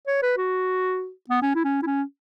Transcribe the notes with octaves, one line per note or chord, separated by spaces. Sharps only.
C#5
B4
F#4
B3
C#4
E4
C#4
E4
C#4